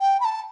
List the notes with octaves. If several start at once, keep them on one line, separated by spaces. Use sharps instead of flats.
G5
B5
A5